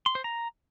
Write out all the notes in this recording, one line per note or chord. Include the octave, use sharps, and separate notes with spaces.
C6
C5
A#5